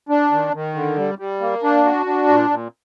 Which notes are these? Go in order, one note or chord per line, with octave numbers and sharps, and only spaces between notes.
D4
D#3
D#3
D3
G3
G3
A#3
D4
F#4
D4
A#2
A#2